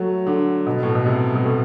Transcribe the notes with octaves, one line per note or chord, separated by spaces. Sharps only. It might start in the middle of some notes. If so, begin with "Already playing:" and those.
Already playing: F#3 A3
D3
B2
A2
B2
C3
B2
A2